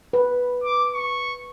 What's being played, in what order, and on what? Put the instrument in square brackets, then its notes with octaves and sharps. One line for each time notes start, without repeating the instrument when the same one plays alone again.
[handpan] B4
[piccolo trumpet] D6
C#6